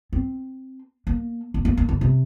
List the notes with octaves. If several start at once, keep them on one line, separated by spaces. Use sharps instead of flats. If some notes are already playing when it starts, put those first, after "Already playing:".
C4
A#3
A#3
A#3
A#3
D3
C3